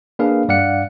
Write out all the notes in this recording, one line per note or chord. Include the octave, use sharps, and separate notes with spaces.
A#3 D4 G#4 B4 F5
G2 D5 F5 F#5 C#7